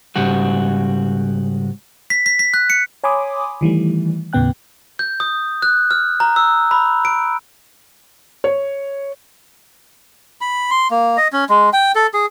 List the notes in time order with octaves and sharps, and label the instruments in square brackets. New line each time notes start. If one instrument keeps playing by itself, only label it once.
[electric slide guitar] G#2 C#3 G3 F#4
[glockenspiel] B6
B6
B6
F#6
C#7
[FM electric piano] C#5 G#5 B5 C6 D6 D#6
D#3 E3 G3 A3
D#2 A2 C#3 B3 G5 F#6
[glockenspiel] G6
D#6
F#6
F6
A#5
E6
B5
D7
[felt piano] C#5
[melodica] B5
C6
A#3
D#5
C#4
G#3
G5
A4
G#4